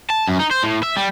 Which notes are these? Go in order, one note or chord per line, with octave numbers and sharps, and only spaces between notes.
A5
F#2
D#4
C5
A2
E5
G3